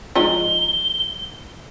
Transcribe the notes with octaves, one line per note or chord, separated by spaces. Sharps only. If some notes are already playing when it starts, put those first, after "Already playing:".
F3 G#3 D#4 G7